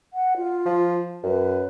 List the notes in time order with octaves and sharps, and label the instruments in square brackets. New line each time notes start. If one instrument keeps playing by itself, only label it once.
[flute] F#5
F4
[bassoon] F3
[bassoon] F#2 [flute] B4